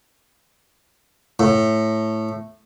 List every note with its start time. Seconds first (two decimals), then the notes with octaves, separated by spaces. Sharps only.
1.40 A2